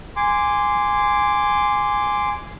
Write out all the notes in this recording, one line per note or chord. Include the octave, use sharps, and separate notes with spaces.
G#5 C6 D6